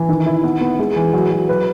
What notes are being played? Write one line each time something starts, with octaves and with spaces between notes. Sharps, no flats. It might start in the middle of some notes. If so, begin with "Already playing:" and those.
Already playing: E3
D#3
E4
B3
B3
G#3
E3
F#3
F#3
B4